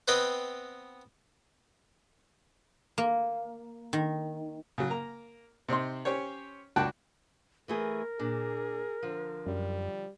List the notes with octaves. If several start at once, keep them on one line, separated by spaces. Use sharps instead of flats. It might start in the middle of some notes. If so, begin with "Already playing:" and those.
B3 C4 B4 D#5 G5
A#3
D#3
C#3 F#3
A#3 A#5
C3 C4 D#4 C6
C#4 G4 C5 C#5
C#2 D4 F#4 G5 A5 F#6
E3 A3 G#4 A#4
A#2 D4 G#4
D3 F3
F#2 G3